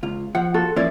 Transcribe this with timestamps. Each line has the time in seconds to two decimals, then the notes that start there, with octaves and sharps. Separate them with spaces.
0.03 C#2 F4
0.35 F3 F#5
0.54 F4 F#4 A4
0.76 F3 A#3 C#4 E4 D5